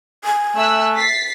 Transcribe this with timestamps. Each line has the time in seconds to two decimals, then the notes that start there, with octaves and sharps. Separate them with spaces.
0.24 G#5
0.56 A3 E5 E6 F#6
0.96 A6 B6 C7